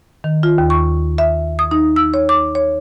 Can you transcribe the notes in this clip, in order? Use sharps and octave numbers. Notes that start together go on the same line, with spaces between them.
D#3
F4
D#2
C#6
E5
D#6
D#4
E6
C#5
D6
C#5